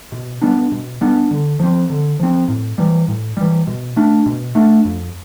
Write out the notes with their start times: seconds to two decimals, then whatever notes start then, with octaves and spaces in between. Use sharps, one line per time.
0.12 B2
0.42 G3 B3 D4
0.72 B2
1.01 G3 B3 D4
1.31 D3
1.60 F3 C4
1.90 D3
2.20 F3 C4
2.48 A2
2.78 E3 G3
3.08 A2
3.37 E3 G3
3.67 B2
3.96 A3 D4
4.26 B2
4.55 A3 D4
4.85 F2